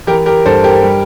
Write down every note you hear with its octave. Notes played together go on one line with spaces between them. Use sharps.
E3 G4 A#4
G4 A#4
G2 A4 C5
G4 A#4
G3